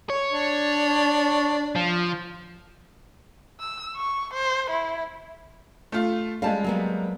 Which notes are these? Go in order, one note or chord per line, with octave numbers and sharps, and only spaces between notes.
C#5
D4
F3
E6
C#6
C5
E4
A3 F4
G3 G#3 F5 A5
F#3 A#3 B3